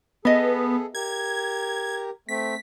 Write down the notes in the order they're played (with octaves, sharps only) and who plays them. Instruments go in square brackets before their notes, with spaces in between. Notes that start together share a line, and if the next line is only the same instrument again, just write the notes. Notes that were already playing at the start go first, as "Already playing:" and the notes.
[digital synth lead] B3 [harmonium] G#4 A4 [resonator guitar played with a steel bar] D#5 E5
[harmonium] G4 A#4 [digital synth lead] G#6
[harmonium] A3 C4 [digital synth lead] B6